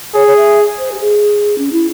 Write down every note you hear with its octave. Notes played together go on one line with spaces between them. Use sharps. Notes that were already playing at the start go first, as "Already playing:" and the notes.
G#4 C#5
C#5
E5
C5
G4
G#4
C#4
E4